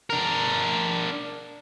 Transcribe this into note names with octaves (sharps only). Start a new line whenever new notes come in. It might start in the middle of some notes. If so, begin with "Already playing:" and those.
D4 A#4